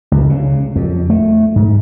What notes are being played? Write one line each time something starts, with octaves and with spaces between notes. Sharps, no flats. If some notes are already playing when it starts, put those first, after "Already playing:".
C#2
C#3
F2
A3
G#2